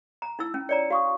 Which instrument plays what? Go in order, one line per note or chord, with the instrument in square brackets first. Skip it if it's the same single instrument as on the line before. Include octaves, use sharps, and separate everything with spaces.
[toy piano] A#5
D#4 E4 E6
C#4
[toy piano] C#5 D5 A#5 [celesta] C#7
[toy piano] F#4 [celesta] F5 C#6 D#6